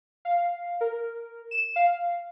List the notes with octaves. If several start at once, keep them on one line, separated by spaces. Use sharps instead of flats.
F5
A#4
E7
F5